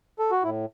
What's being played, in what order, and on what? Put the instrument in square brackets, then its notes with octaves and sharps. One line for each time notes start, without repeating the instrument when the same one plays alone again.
[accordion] A4
F#4
A2 E4